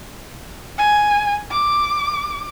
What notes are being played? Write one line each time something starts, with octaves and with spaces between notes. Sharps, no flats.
G#5
D6